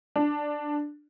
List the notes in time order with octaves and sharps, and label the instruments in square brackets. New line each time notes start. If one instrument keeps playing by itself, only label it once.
[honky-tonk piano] D4